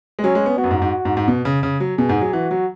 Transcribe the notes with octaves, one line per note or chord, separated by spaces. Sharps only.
G#3
F#3 C#4
G#3
B3
B3 F#4
F#2
G#2
G#2
G#2
G#2
B2
C#3
C#3
F#3
B2 G#4
G#2
F#3
E3 F#4
F#3